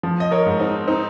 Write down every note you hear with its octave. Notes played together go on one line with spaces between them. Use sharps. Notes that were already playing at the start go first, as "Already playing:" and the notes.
F3
D#5
A#4 C#5
G#2
C4 D#4
C4 D#4